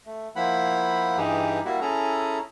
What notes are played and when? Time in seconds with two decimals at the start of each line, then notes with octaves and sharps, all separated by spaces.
0.06 A3
0.36 F3 A#3 E4 F#5 B5
1.17 G2 E3 D#4 G4 G#4
1.65 G3 A#3 E4 F#4
1.81 C#4 E4 G#4 A4 A#5